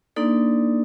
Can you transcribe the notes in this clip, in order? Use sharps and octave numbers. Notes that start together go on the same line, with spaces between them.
A#3 D4 D#4 A4 D5